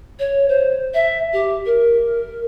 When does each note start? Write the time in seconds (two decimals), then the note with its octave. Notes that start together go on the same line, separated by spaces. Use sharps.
0.19 C#5
0.49 C5
0.94 E5
1.33 G4
1.66 A#4